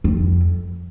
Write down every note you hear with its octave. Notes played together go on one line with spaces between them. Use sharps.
F2